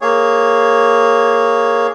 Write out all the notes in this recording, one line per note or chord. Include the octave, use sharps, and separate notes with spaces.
A#3 G#4 C#5